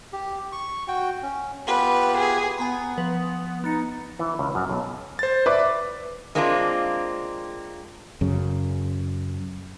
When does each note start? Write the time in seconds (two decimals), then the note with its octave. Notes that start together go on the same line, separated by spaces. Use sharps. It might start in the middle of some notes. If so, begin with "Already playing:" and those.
0.13 G4
0.52 C#6
0.88 F#4 G5
1.23 C#4
1.67 B3 F4 G4 B4
2.19 G#4
2.58 B3 G#5 A#5 B5
2.98 F3 B4
3.64 B3 D#4 A6 C#7
4.19 E3
4.39 C#2
4.55 F#2
4.69 B1
5.19 C5 A6
5.46 B4 D5 E5 D6
6.35 G#3 A#3 C4 D4 D#4 F4
8.21 F#2 C#3